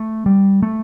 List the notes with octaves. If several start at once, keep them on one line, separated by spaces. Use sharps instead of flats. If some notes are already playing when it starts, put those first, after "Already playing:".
Already playing: A3
G3
A3